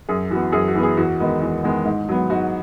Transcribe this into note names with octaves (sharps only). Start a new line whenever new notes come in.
F#2 G#4
E3 B3 F#4
F#2 G#4
F#4
E3 B3
G#4
E2 F#4
D#3 G#3 B3
E2
D#3 G#3 B3
G#2
F#3 B3
G#2 F#4